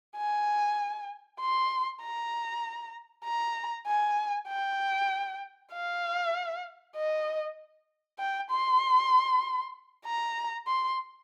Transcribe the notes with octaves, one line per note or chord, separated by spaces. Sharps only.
G#5
C6
A#5
A#5
G#5
G5
F5
D#5
G5
C6
A#5
C6